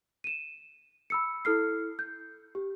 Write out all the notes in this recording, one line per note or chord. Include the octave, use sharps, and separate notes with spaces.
D#7 E7
B5 E6 C#7
E4 A4 F6 C7
G6
G4